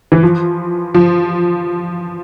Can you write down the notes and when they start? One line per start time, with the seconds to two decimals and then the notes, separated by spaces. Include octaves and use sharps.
0.12 E3
0.23 F3
0.95 F3